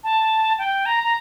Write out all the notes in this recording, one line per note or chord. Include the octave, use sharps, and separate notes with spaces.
A5
G5
A#5
A#5